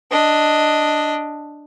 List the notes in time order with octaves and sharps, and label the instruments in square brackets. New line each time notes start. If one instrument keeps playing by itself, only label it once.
[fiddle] D4 D#5